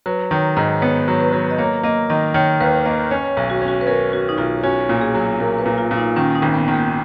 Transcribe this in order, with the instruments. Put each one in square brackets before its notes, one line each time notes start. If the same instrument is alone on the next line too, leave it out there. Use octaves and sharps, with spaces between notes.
[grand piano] F#3 [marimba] B4
[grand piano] D#3 [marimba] C#5
[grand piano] G#2 [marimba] D#5
[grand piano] B3 [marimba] C#5
[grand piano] F#3
[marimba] B4
[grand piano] F#3
[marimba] D#5
[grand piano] A#3 [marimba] C#5
[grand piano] A#3 [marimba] D#5
[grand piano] D#3 [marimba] D#5
[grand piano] D#3 [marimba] C#5
[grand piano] D#2 [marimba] B4
[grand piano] A#3 [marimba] D#5
[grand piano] C#4 [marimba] C#5
[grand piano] B1
[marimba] F#4
[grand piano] C#4
[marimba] F#4
B4
[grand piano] C#4 [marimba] A#4
[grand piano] C#4 [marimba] F#4
[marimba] D#4
[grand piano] B1 [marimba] F4
[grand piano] C#4 [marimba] F#4
[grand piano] A#2
[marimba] G#4
[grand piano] F#3
[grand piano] A#2 [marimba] A#4
[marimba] B4
[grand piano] A#2
[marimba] F4
[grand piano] A#2
[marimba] D#4
[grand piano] D#3 [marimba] C#4
[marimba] D#4
[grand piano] G#1
[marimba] B3
[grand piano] D#3
[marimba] A#3